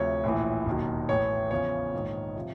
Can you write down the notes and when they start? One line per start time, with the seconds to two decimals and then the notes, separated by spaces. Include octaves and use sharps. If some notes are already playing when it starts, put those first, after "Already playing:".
Already playing: D2 C3 F3 C#5
0.24 A#1 A2 E3
0.66 E1 D#2 D#3 F#3
1.09 A1 A2 E3 C#5
1.51 E2 C#3 F3 C#5
1.93 A#1 G#2 D#3
2.36 C3 F3